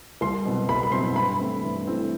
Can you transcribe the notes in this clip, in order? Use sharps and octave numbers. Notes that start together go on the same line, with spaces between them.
C2 C6
B2 F#3 C4 E4
C2 B5
B5
B2 F#3 C4 E4 C6
G2 B5
E3 A3 C4 E4
G2
E3 A3 C4 E4